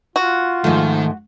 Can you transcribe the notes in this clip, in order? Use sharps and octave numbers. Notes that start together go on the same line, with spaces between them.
F4 F#4
G#2 D#3 F3 A3